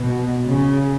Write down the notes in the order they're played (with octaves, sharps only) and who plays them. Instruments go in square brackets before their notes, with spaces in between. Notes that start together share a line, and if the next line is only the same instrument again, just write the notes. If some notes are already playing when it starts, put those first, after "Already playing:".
Already playing: [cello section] B2
C#3